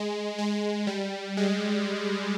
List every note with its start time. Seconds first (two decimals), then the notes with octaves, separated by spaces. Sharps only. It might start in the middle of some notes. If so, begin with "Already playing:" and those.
Already playing: G#3
0.38 G#3
0.87 G3
1.37 G#3